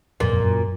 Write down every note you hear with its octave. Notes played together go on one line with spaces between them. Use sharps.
F2 A#2
F2
F#2